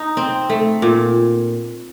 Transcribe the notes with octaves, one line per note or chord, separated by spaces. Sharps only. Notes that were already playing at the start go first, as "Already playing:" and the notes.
Already playing: D#4
C4
A3
A#2